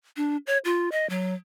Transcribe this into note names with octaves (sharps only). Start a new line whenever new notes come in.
D4
C#5
F4
D#5
F#3